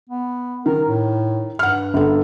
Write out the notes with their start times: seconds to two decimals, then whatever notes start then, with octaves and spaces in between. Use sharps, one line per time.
0.09 B3
0.66 D#3 A#4
0.88 A2
1.59 G2 F#5 F6
1.94 G1 A4